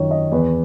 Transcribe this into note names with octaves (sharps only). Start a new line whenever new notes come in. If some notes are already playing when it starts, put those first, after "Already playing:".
Already playing: F#2 D#3 C#5
D#5
E2 B4